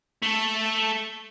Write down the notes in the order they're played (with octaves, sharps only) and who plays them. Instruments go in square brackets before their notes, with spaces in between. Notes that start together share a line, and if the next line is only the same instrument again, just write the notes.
[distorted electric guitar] A3 A4